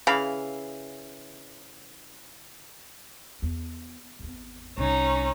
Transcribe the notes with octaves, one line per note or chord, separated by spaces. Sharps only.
C#3 E3 F5 B5
E2
G#1 E2
C2 C#4 D#4